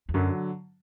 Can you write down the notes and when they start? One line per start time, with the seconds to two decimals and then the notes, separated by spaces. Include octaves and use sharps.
0.09 E2
0.14 F#2 D3 F#3